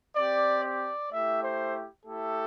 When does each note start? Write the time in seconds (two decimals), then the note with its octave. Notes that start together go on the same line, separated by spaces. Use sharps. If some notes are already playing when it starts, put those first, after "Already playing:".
0.16 C4 G4 D5
0.64 D5
1.11 A3 E4 G4 E5
1.43 C5
2.05 A3 E4 G4 A4